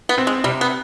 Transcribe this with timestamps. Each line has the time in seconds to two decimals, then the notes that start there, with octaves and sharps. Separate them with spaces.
0.09 B3
0.18 C4
0.27 G#3
0.44 C3 G3
0.61 B3